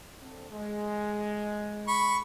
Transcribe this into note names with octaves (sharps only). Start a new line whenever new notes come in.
D3 C4
G#3
B5 C#6